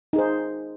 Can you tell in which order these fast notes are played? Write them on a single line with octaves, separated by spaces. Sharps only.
D#4 G#4 C5